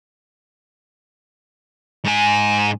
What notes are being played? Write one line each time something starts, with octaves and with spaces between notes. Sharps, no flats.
G#2 G#5